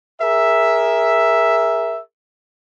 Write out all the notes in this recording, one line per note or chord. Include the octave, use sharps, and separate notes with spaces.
G#4 A#4 E5